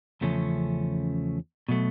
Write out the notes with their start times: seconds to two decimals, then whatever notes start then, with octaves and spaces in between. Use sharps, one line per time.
0.21 E2 C#3 F3 A3 C#4
1.69 B2 F#3 A3